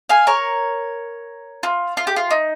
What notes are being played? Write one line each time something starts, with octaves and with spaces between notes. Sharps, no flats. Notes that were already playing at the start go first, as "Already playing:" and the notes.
F5 G#5
A#4 C#5
F4
F4
G4
F4
D#4